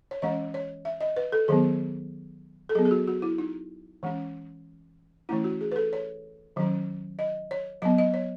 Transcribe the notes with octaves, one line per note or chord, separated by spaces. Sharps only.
C#5
E3 G#3 C#4 D#5
C#5
E5
D#5
B4
A4
D#3 F#3 B3 G#4
A4
F#3 B3 G#4
G#4
F#4
F#4
E4
D#4
E3 G#3 C#4
E3 A3 C#4 E4
F#4
G#4
B4
A4
C#5
D#3 F#3 C#4
D#5
C#5
F#3 B3 D#5
D#5
C#5